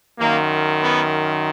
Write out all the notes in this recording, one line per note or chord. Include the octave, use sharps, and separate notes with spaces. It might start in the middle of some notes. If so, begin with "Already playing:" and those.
F#2 D#3 A#3
B3